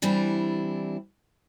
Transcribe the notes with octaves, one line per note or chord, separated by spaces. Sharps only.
E3 G3 C4 D4 E4